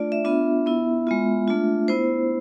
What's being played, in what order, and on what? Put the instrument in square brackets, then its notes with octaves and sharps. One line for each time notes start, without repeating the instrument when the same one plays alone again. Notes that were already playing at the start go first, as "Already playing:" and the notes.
Already playing: [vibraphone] A3 D4 F4 D5
E5
B3 D4 F4 E5
B3 E4
G#3 B3 F4
A3 D4 F4
B3 E4 C5